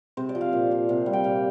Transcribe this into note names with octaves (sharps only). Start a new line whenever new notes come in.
C3 C5
D5
F3
F5
A#2
F3
C3
G3
G5
A#2 F5